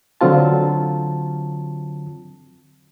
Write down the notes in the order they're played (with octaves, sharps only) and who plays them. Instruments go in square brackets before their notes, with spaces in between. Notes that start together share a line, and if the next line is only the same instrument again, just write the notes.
[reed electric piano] D3 F#3 C4 F4 A5